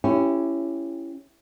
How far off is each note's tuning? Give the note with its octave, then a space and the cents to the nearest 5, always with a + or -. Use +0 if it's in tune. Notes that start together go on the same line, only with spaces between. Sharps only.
C#4 +0 E4 +20 G4 +5